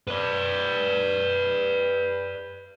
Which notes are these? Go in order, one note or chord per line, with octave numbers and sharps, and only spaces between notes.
B4 D5